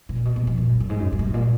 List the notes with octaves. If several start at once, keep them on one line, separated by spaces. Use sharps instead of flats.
B2
A#2
B2
B2
F3
A#2
F#2
F#2
G#2
F#2
F#2
G#2
F#2
A#2